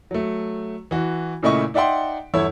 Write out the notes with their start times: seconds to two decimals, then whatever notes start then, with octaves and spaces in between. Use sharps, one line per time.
0.11 F#3 A3
0.91 E3 F#4
1.43 A#2 C#3 A3 E4 D#5 C#6
1.74 D#4 D5 E5 F#5 G5 C6
2.34 G1 E2 E4 A4 C#5 E6